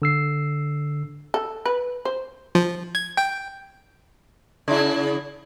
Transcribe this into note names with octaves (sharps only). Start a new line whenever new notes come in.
D3 E6 C7
A4
B4
C5
F3
G#6
G5
C#3 E4